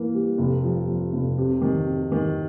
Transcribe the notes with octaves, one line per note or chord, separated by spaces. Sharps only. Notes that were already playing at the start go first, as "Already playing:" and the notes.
Already playing: E3 A#3
G3
F1
F3
F3
F1
C3
D#3
C3
D#3